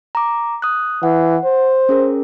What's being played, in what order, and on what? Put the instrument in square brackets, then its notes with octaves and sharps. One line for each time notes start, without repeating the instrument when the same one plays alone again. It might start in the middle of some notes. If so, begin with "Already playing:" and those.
[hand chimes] A#5 D6
D#6 F#6
[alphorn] E3 [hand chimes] F#5
[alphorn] C5
[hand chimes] C#4 G#4 A#4